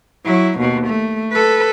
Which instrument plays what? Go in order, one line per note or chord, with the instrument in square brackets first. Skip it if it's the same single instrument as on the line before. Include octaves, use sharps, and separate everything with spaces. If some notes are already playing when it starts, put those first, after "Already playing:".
[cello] F#3 E4
D#2 B2
A3
A4 B4